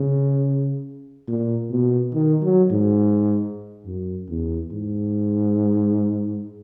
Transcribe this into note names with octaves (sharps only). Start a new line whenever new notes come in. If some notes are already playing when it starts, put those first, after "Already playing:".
Already playing: C#3
A#2
B2
D#3
F#3
G#2
F#2
E2
G#2